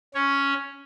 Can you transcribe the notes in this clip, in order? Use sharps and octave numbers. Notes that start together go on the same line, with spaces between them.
C#4 C#5